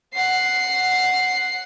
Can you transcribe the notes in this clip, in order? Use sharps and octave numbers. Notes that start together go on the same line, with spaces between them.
F#5 C7